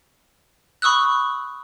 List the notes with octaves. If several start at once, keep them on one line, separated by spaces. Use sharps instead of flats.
B5 C#6 D#6 E6 F#6